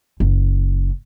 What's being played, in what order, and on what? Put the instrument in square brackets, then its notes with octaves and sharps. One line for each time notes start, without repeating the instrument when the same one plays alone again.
[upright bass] F#1